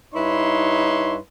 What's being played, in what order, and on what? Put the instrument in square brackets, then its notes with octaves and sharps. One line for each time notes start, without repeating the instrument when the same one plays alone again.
[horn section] G2 D#4 E4 B4 C#5 C6